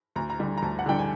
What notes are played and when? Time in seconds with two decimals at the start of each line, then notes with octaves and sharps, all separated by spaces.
0.16 D2 A#5
0.30 A#5
0.39 D3 G3
0.57 A#5
0.62 D2 A5
0.79 F#5
0.86 D3 G3 G5
0.99 G#5